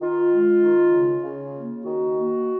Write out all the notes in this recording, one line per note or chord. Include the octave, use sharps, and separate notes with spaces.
D#3 F4
G#3
D#3
C#3
C#3
A#3
D#3 F#4
A#3